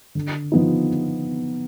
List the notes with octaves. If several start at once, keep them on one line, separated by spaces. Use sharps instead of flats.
D3
F3 B3 D#4